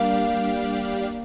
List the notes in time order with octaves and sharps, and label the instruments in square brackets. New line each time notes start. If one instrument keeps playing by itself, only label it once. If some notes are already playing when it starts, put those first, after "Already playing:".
Already playing: [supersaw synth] G3 D4 G4 D5 F5 [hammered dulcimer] A#3